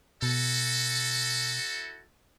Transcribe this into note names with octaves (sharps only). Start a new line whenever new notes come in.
B2 E4 F#4 A4